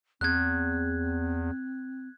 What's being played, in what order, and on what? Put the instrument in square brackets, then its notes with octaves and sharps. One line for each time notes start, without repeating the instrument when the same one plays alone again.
[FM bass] E2 [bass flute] C4 [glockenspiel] F#6 G#6